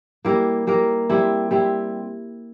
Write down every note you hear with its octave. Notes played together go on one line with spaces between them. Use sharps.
G3 A#3 E4 A#4
G3 A#3 E4 A#4
G3 C4 E4
G3 C4 E4